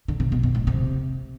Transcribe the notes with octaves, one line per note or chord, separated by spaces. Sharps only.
D3
C3
B2
B2
A2
C3